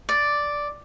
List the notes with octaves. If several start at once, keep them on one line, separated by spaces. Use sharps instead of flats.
D5